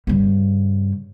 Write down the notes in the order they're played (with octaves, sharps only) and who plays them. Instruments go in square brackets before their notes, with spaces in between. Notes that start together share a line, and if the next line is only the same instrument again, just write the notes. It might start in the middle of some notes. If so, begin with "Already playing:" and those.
[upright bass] G2 C#3